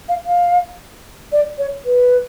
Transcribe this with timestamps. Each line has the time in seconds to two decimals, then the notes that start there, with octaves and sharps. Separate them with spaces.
0.09 F5
0.26 F5
1.32 D5
1.58 C#5
1.85 B4